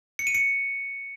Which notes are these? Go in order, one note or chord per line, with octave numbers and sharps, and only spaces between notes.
C#7
D#7
C#7